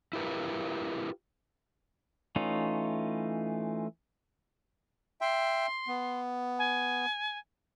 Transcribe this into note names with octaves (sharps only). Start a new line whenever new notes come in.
E4 F4 G4 A#4 B4
E3 A3 C#4 D#4 F4
E5 G5 C6
B3
G#5